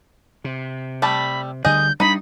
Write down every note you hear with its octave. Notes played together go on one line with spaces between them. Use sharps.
C3
G3 A3 A5 B5
D2 D3 G3 G#4 D#5 G6
G3 B3 D4 D#4 D#5 B5